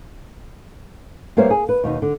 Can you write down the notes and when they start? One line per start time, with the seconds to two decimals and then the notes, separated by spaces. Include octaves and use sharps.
1.37 G3 A#3 B3 C5 C#5 E5
1.50 G#4
1.69 B4
1.84 D#2 B2 D#4
2.02 D3